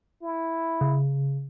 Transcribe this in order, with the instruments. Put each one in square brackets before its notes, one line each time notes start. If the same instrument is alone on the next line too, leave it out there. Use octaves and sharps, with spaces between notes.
[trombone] E4
[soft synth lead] C#3